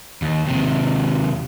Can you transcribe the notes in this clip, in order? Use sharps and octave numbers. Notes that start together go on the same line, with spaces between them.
D#2
D#2 C3